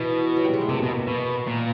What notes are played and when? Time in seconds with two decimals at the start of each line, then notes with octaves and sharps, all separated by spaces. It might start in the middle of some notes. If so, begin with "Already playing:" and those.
Already playing: B2 E3
0.37 F#3
0.44 G3
0.53 G#3
0.61 A3
0.69 C3 A#3
0.82 B2
1.08 B2
1.47 A#2 B3